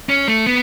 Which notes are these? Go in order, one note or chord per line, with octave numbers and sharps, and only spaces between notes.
C#4
A3
B3